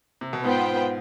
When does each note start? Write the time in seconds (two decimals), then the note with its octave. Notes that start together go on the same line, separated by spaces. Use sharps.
0.21 C3
0.33 B2
0.44 G#2 B3 F4 C5 G5